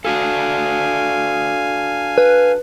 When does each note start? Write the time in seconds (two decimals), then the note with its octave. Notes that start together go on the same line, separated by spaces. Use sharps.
0.05 D4 F#4 A4 F5 G#5
2.18 B4